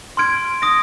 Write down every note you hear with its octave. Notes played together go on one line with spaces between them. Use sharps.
C6 F6 G#6 D7
D#6 A#6 D7